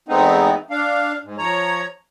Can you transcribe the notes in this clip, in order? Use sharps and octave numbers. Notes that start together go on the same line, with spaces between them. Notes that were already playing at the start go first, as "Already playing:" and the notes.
E2 G#3 A3 B3 C4 D#4
D4 F5
G#2
F3 C#5 A#5